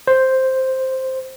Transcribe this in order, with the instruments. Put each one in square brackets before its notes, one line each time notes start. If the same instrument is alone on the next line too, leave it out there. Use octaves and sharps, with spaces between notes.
[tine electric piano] C5